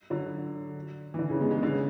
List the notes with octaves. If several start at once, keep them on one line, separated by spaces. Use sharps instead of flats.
D3 F#3
E3
D3
C#3 E3
G#3 B3
G#3 B3
D3
C#3